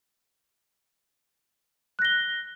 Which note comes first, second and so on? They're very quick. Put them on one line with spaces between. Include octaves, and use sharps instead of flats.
F#6 A#6 G7